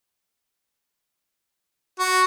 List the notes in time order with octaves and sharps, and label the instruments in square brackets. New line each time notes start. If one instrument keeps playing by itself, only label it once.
[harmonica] F#4